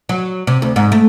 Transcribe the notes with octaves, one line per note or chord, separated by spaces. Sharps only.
F#3
C3
D2
G#2
A3